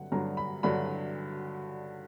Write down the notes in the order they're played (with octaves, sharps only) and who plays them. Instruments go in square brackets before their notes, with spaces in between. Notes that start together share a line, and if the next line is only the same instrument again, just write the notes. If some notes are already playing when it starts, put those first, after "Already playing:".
Already playing: [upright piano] G2 D3 F#3 F#5
G2 D3 F#3 A#5
B5
G2 D3 F#3 B5